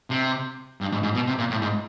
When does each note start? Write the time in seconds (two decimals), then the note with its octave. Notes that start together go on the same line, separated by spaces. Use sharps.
0.10 C3
0.81 G2
0.92 G#2
1.03 G#2
1.15 B2
1.27 C3
1.39 A#2
1.50 A2
1.62 G#2